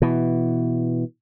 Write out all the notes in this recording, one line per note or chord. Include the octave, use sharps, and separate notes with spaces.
B2 E3